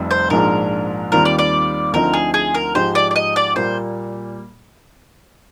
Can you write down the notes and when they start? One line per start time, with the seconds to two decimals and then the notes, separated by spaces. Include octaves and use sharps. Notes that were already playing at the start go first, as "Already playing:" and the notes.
Already playing: F1 F2 C3 G3
0.11 C5
0.30 A#1 G#2 F3 G#3 D4 A#4
1.12 D#2 D#3 G3 C4 F4 A#4
1.25 D5
1.39 D5
1.93 D2 D3 F3 C4 D#4 A#4
2.13 G#4
2.34 G#4
2.55 A#4
2.75 G#2 F3 G#3 D#4 G4 C5
2.95 D5
3.11 D5
3.16 D#5
3.36 D5
3.56 A#2 G3 A#3 C5